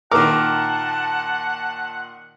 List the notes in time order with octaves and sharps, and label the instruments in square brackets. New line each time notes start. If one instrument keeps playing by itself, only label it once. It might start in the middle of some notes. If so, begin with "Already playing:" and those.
[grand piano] A#2 D#3 [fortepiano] A#4 D6 [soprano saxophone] F#5 [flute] A5